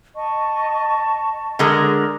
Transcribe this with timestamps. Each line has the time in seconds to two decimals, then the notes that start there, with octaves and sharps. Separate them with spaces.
0.16 D#5 A5 C#6
1.59 D3 G#3 A#4